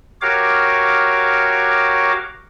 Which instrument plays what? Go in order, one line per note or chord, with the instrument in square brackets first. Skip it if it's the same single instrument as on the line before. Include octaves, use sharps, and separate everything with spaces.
[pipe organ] F#4 G4 A#4 C#5 F5 D6